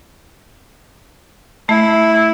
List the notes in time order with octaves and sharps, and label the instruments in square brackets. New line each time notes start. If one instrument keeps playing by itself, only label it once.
[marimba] A3 [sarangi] E4